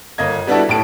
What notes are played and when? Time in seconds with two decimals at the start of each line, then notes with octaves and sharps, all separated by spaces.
0.18 G1 A#3 D#5 G#6
0.47 G3 B3 D4 E4 F#4 A4
0.68 D#1 A2 A5 D7